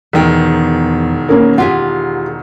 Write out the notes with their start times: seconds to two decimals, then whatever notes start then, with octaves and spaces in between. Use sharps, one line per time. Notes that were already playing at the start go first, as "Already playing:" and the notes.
0.13 E1 E2 D#3 G5
1.29 A#3 C#4 A#4
1.58 F4 G4 G#4 F#5